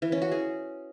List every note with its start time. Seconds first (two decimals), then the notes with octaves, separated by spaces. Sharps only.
0.02 E3
0.12 C#4
0.22 F#4
0.32 G#4